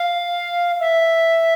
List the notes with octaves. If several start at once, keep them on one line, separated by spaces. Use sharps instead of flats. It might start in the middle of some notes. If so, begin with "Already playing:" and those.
Already playing: F5
E5